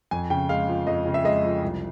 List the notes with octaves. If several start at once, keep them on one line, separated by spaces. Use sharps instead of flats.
F2 G#5
C#3 G5
G#3 F5
F3
F2 D#5
C#3
E5
G#3 D#5
F3
C2